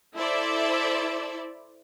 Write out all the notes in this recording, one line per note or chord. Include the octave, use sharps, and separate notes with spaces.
E4 A4 C5 D5 E5